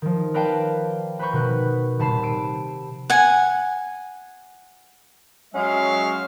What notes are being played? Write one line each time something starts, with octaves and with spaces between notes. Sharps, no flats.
D#3 F3
A#4 B4 D5 F5 G5 A5
B4 C5 A#5 B5 C#6 G6
B2 D#3 B4 F#6
D#1 C3 A5 B5 C7 E7
E6 D7 D#7
F#5 G#5
F#3 G#3 C#4 E5 F5